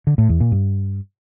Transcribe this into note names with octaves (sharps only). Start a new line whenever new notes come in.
D3
A2
E2
A#2
G2